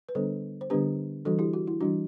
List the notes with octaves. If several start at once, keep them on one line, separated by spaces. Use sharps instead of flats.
B4
D3 G3 B3 D4 A4 C5
C5
D3 G3 B3 D4 G4 B4
E3 G3 D4 F#4 A4
E4 G4
F#4
E4
E3 G3 D4 F#4